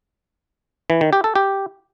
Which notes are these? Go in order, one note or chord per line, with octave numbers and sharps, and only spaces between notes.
E3
D#3
G4
A4
G4